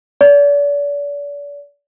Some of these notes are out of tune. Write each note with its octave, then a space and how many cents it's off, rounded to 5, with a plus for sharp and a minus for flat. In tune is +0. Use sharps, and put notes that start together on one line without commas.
D5 -40